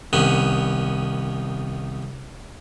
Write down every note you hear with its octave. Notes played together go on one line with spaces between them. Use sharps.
C2 D#3 B3 C#4